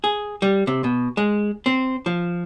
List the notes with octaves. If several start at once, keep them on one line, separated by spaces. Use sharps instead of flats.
G#4
G3
C3
B2
G#3
C4
F3